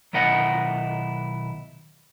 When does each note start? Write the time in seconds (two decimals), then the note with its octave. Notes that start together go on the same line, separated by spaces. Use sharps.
0.13 B1 D#3 E4 D#5 F#5